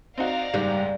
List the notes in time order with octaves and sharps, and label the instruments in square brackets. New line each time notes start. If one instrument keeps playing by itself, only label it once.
[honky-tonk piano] C4 D#4 F#4 [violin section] D5 F5 A#5
[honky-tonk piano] F#1 G#2 [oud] G3